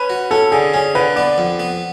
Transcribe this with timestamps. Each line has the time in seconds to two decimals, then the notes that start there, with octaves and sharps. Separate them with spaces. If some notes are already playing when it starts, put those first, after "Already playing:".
Already playing: C#4 B4
0.10 F#4
0.31 C#4 A4
0.52 D3 G#4
0.74 C#4 G#4
0.95 D3 B4
1.16 B3 D5
1.38 F2
1.60 B3